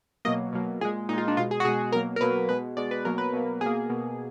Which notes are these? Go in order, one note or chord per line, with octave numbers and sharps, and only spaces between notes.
B2 F#3 A#3 D#5
B2 F#3 A#3
A#2 G#3 G#4
A#2 G#3 D#4 F4
D4
B2 G#3 F4
G#4
F#4
B2 G#3 G#4
B2 F#3 A#3 A#4
A#4
B2 F#3 A#3 B4
B2 G#3 B4
B2 G#3 D5
B4
B2 F#3 A#3 A#4
B4
B2 F#3 A#3
B2 A#3 G#4
B2 A#3